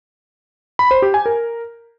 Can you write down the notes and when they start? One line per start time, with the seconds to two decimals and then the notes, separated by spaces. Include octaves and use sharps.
0.79 B5
0.91 C5
1.02 G4
1.14 G#5
1.26 A#4